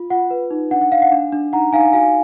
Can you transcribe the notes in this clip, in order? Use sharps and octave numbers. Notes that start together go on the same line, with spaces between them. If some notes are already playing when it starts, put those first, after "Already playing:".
Already playing: F4
F4 F#5
B4
D#4
D4 F#5
F#5
D4 F5
F#5
D4
D4
D#4 F#5 A#5
D#4 F5 G#5
F#4 F5 G#5